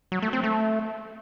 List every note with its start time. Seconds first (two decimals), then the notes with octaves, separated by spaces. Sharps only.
0.12 F#3
0.22 A3
0.33 C4
0.44 A3